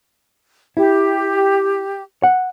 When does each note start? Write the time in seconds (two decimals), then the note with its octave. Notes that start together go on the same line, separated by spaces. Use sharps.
0.77 E4 G4
2.23 F#5